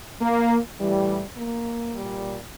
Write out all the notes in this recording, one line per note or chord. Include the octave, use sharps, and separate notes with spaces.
A#3
A2 E3 G3
A#3
A#2 G3